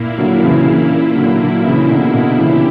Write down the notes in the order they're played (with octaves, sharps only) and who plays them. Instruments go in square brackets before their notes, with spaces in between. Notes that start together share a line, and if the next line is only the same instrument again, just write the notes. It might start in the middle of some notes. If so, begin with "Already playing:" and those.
Already playing: [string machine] A#2 A#3 E4
[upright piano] D3 F#3
C#3 E3
C#3 E3
D3 F#3
D3 F#3
C#3 E3
B2 D3
B2 D3
[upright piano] C#3 E3 [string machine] E4 G4